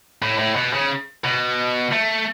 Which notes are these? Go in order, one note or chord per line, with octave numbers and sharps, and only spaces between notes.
A2
A2
B2
C#3
B2
A3